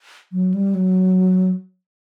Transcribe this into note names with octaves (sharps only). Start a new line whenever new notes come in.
F#3
G3
F#3